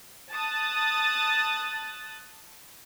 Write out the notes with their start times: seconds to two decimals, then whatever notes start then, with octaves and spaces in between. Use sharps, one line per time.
0.32 A5 D#6 F#6 A6